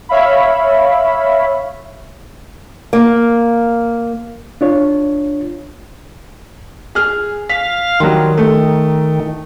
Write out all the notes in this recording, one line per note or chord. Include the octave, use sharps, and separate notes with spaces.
C#5 E5 F5 B5
A#3
D4 F4 C#5
G#4 F6
F5 B6
D#3 F#3 G3 C6
A3